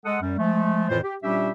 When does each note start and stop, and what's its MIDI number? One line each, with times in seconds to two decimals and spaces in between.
0.05 0.18 56
0.05 0.18 69
0.05 0.18 78
0.05 0.18 87
0.21 0.34 42
0.21 0.34 55
0.38 0.88 53
0.38 0.88 56
0.38 0.88 57
0.89 0.98 41
0.89 0.98 45
0.89 0.98 51
0.89 0.98 52
0.89 0.98 65
0.89 0.98 72
1.03 1.15 67
1.23 1.50 46
1.23 1.50 55
1.23 1.50 61
1.23 1.50 62
1.23 1.50 67
1.23 1.50 76